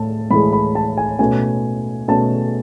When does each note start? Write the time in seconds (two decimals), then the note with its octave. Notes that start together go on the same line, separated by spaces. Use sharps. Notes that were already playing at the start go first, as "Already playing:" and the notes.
Already playing: A2 A5
0.31 A2 E3 G#3 B5
0.53 B5
0.75 A5
0.97 G#5
1.19 B2 A3 C#4 G#5
2.08 B2 A3 C#4 A5